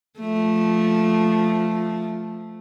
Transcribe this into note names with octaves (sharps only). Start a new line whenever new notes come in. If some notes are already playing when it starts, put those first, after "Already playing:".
F3 A3